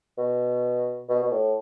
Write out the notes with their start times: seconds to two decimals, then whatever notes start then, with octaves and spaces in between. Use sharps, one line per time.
0.18 B2
1.09 B2
1.22 B2
1.32 A2